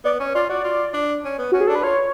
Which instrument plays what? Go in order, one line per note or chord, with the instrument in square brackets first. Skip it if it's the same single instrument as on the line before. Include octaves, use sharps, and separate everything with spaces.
[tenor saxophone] B3 [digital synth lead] D5
[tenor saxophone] C#4 [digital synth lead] C#5
[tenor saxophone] F4 [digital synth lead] D5
[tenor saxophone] F#4 [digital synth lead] D5
[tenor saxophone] F4
D4
C#4
B3
[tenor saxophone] C#4 [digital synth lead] F#4
[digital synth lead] G#4
[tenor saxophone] D4 [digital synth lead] A4
[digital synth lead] B4
[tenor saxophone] F4 [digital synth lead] C#5